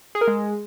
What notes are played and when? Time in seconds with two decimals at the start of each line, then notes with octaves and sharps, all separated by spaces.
0.15 G#4
0.21 A#4
0.28 G#3